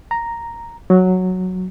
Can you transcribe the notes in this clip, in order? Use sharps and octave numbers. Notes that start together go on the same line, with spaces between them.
A#5
F#3